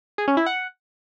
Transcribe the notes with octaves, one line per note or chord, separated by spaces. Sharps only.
G#4
C#4
E4
F#5